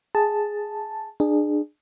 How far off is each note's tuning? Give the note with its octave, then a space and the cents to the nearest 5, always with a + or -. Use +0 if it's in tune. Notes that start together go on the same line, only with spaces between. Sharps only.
G#4 +0 A5 +0
D4 +30 G#4 +0